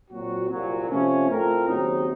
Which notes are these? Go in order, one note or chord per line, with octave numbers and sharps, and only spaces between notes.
A#2 F#3 C4 F#4
C2 A#2 F#3
C3 F3 A3 C#4
A2 A3 C4 F4 A#4
D#2 C#3 F#3 C4 D#4